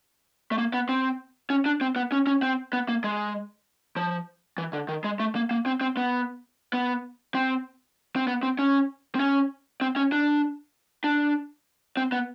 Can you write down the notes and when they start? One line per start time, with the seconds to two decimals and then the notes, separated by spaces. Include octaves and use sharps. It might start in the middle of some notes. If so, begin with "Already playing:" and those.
0.52 A3
0.58 A#3
0.74 B3
0.89 C4
1.50 C#4
1.66 D4
1.81 C4
1.96 B3
2.12 C#4
2.27 C#4
2.42 C4
2.73 B3
2.88 A#3
3.04 G#3
3.96 F3
4.58 E3
4.73 D3
4.89 D#3
5.04 G#3
5.20 A3
5.35 A#3
5.51 A#3
5.66 C4
5.81 C4
5.97 B3
6.73 B3
7.35 C4
8.16 C4
8.27 B3
8.43 C4
8.59 C#4
9.15 C4
9.20 C#4
9.81 C4
9.96 C#4
10.12 D4
11.04 D4
11.97 C4
12.12 B3